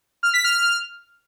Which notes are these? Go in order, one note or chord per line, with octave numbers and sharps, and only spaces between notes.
F6
B6
F6